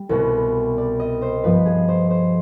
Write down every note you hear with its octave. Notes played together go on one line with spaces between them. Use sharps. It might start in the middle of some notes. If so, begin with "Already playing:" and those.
Already playing: G3
C2 B2 B3
D5
D#5
C5
G2 F3 B3 B4
G#4
C5
C5